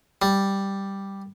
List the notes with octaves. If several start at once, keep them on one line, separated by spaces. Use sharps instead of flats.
G3